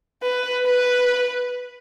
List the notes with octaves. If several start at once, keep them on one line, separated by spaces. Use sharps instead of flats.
B4
B4